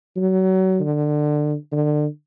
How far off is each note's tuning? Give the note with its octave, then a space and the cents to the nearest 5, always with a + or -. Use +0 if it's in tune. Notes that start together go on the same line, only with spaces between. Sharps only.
F#3 +30
D3 +20
D3 +30